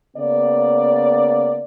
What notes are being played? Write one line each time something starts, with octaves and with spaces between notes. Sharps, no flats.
C#3 A#3 B3 D5